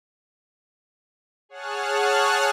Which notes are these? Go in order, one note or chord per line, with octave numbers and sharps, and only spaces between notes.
G#4 C#5 F#5 A5 F6 F#6